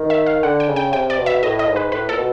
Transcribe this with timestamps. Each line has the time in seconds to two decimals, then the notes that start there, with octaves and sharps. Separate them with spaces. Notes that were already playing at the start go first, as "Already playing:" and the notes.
Already playing: D#3
0.10 E5
0.26 F5
0.43 D3 F#5
0.60 G5
0.68 C#3
0.76 G5
0.92 C3 G5
1.10 D5
1.18 B2
1.26 E5
1.43 A2 D#5
1.59 D#5
1.68 G#2
1.76 B4
1.92 A2 B4
2.09 A#2 A4
2.17 B2